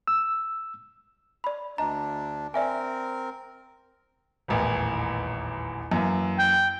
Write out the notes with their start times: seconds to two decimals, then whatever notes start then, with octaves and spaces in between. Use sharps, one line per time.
0.08 E6
1.44 D5 B5
1.78 D2 D4 D#5 A#5
2.54 C4 A#4 D5 E5 G#5
4.48 D#1 A1 E2
5.92 F#2 E3 A#3
6.37 G5